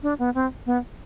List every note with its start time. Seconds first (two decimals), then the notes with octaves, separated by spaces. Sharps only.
0.03 D4
0.19 B3
0.34 C4
0.66 B3